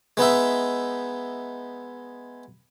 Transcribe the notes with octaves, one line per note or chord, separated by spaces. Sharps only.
G#3 B3 D#4 E5